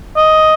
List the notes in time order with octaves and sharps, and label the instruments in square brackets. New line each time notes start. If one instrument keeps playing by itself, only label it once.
[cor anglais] D#5